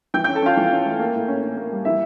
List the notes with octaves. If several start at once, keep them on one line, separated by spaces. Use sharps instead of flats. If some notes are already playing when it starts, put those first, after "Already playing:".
E3 G5 G6
G5 G6
C#4
A4 A5
C#4 F4 F5
E3
C#4
A3
A#3
A2
C#4
C#4
A#3
G3
E3 E4 E5